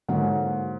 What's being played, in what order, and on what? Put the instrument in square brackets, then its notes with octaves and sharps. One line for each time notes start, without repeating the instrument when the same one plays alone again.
[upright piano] G#2 [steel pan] D3 F#3 A#3 C#4 F#4